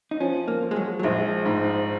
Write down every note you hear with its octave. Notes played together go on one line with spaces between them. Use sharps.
D#4
F3 C#4
A#3
F3
G#3
F#3
F#3
A#1 G#3
G#2